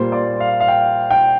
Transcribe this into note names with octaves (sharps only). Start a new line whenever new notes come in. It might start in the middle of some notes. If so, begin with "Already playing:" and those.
Already playing: A#2 G3 A#3 C5
D5
F5
F5
G5
G5